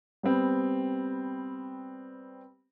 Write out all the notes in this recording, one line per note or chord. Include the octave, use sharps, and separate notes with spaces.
G3 B3 C4